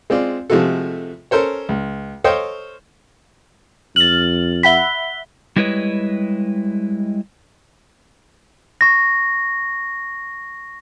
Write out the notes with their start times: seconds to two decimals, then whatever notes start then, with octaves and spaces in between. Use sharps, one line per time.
0.10 G#3 C4 F4 D5
0.50 C3 F3 G#3 A3 F#4 A4
1.31 C#4 A4 A#4 C5 C#5
1.69 C#2
2.24 A4 C5 C#5 D#5 F5 G5
3.96 F2 F6 A6 F#7
4.63 E5 F#5 B5 B6 G7
5.56 G3 G#3 E4 B4 C#5 D#5
8.81 C#6 A#6